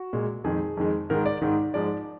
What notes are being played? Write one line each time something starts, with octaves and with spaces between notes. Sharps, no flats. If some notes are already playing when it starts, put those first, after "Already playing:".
Already playing: F#4
A#2 G#3
F2 D#3 G#3 G#4
F2 D#3 G#3
G#2 D#3 G#3 A#4
D5
G#2 D#3 G#3
G#2 F3 G#3 D5